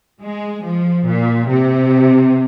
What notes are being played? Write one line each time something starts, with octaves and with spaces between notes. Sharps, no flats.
G#3
F3
A#2
C3